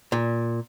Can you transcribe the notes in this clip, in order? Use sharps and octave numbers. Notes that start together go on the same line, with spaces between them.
A#2